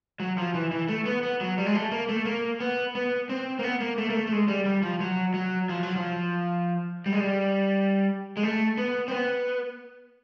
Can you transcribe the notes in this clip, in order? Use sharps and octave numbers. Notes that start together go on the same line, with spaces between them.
F#3
F3
E3
E3
A3
B3
B3
F#3
G3
G#3
A3
A#3
A3
A#3
B3
B3
C4
A#3
B3
A#3
A3
A#3
A3
A3
G#3
G3
G3
F3
F#3
F#3
F3
F#3
F3
G3
G#3
G3
G#3
A3
B3
C4
B3